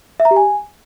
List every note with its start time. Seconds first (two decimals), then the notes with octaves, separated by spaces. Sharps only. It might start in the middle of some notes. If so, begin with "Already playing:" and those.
0.20 E5
0.25 A#5
0.31 G4
0.36 G#5